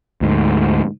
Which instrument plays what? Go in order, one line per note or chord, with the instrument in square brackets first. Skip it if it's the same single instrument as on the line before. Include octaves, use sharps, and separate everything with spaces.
[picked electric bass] D2 G#2